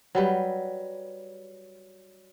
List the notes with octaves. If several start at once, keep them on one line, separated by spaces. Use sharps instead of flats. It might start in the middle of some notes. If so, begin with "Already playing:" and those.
F#3 G3 B4